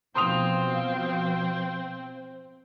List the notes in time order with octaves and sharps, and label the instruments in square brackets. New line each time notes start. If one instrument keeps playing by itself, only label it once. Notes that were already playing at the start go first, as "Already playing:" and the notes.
[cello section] B2 F3 F5 [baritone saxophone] C4 [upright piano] C6 D#6 F7